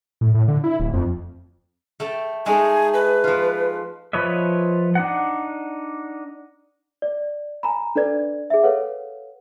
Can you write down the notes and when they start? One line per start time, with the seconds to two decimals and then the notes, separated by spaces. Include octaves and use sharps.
0.21 A2
0.34 A2
0.48 D3
0.64 E4
0.80 D1
0.93 F2
2.00 A3 G5 A5
2.46 G#3 A3 D#4 G#5
2.94 B4
3.24 F3 F4
4.13 F3 B4 C#5 D#5 E5
4.95 D4 D#4 F#5
7.02 D5
7.63 G#5 A#5 B5
7.96 D4 A4 B4 D5 G#6
8.50 G#4 E5
8.63 A4 B4 C#5 F5 F#5